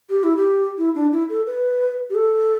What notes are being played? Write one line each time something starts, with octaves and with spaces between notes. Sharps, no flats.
G4
E4
G4
E4
D4
E4
A4
B4
G4
A4